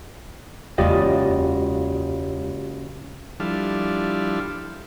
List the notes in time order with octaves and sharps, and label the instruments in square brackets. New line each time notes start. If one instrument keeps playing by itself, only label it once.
[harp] F#1 [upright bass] E2 A#3 [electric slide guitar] G#3 D5 D#5 [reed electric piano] F4 G4
[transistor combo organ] F3 G3 D4 E4 A4 F5